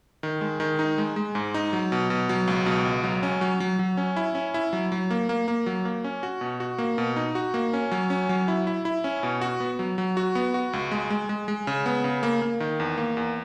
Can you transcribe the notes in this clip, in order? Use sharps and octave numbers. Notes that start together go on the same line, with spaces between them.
D#3
G#3
D#3
D#4
G#3
G#3
G#2
D#4
F#3
B2
B2
F#3
C#2
B2
C#2
F#3
C#4
F#3
F#3
F#3
C#4
E4
C#4
E4
F#3
F#3
A#3
A#3
A#3
F#3
A#3
C#4
F#4
B2
F#4
A#3
B2
D#4
F#4
A#3
C#4
F#3
C#4
F#3
E4
E4
E4
C#4
B2
F#4
B3
F#3
F#3
F#4
B3
F#4
C#2
G#3
G#3
G#3
G#3
C#3
B3
C#3
A#3
A#3
D#3
E2
A#3
E2